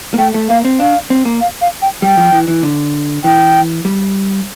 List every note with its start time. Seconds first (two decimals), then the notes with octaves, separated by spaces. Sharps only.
0.14 A#3
0.18 A3 G5
0.34 A3
0.49 A#3 F5
0.65 C4
0.80 D4 F5
1.10 C4
1.25 A#3
1.41 F5
1.62 F5
1.82 G5
2.02 G3 G5
2.17 F3
2.32 E3
2.48 E3
2.63 D3
3.24 E3 G5
3.85 G3